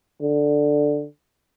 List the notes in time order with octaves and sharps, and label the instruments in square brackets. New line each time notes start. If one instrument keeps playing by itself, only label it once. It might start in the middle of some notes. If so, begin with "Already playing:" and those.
[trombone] D3